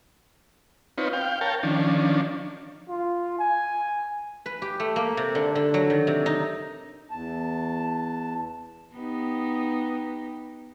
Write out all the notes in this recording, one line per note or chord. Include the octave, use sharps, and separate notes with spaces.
C4 D#4 F4 B4 C#5
F5 G5
A#4 C#5 F5 G5 A5
D#3 F3 C#4 D4
F4
G#5
B4
G4
A3
A#3
C3
D3
D3
F#3
D#3
C3
D#4
E2 A5
B3 D#4 G4